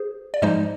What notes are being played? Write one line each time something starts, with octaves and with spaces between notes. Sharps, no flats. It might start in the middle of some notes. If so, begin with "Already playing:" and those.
Already playing: G#4 C5
D5
G#2 F3 G#3 D#4 C5 D#5